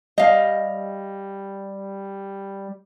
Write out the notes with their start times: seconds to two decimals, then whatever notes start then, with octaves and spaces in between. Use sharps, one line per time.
0.18 G3 D#5 F5